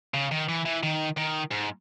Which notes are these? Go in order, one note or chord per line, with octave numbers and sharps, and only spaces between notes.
C#3
D#3
E3
E3
D#3
D#3
G#2